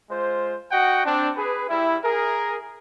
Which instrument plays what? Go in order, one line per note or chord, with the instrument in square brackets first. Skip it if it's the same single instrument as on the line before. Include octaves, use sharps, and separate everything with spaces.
[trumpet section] G#3 F4 C5
F#4 D#5 F#5 G5
C4 D4
G#4 B4
G3 E4
G#4 A#4